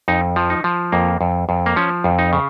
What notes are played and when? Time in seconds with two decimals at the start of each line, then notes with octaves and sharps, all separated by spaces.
0.08 F2 D#4
0.36 F3
0.50 D#4
0.64 F3
0.92 F2 A#3
1.21 F2
1.49 F2
1.66 A#3
1.76 F3 C#4
2.04 F2
2.19 D#4
2.33 C#3